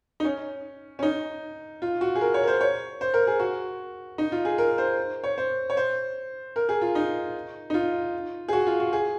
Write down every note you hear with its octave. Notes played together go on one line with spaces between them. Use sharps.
D#4
C#4
C#4
D#4
F4
F#4
G#4
A#4
C#5
A#4
C5
C#5
C5
A#4
G#4
F#4
D#4
F4
G#4
A#4
C5
C#5
C5
C#5
C5
A#4
G#4
F4
D#4
D#4
F4
G#4
F#4
F4
F#4
G#4